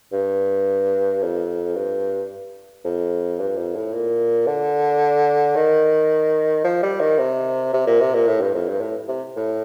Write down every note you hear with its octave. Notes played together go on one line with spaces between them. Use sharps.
G2
F2
G2
F2
G2
F2
A2
A#2
D3
D#3
F3
G3
D#3
C3
C3
A#2
C3
A#2
A2
G2
F2
G2
A2
C3
A2